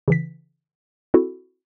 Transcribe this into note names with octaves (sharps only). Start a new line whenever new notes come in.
C#3 E3 B6
C4 E4 F#4 A4